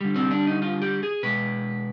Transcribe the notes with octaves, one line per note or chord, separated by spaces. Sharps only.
D3 G3
C4
D4
D#4
F4
G4
G#4
B2 G#3 B4